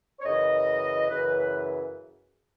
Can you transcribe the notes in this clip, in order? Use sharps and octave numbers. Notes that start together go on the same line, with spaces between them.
C#5
F#2 C#3 E3 D#5
F#2 C#3 E3 B4
B4